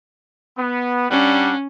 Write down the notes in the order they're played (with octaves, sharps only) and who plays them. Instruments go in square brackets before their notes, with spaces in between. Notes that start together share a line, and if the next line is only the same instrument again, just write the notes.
[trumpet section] B3
[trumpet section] G3 D4 F#5 [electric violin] C#4